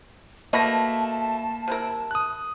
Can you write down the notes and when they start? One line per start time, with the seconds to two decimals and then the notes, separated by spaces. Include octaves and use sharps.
0.53 B2 A3 A#3 D#5 A5 B5 A#6
1.68 C3 E4 A#4
2.11 D#6 F#6